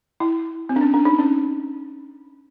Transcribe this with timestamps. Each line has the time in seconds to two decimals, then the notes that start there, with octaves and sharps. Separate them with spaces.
0.20 E4
0.69 C4
0.76 D4
0.81 C#4
0.94 D4
1.05 D#4
1.19 C#4